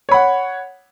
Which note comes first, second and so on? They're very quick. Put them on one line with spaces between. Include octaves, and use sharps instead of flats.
C#5 B5 F#5